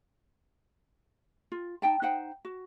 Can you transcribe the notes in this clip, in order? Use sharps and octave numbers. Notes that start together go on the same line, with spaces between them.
F4
D#4 G4 G5 A5
D#4 C5 F#5 G5
F#4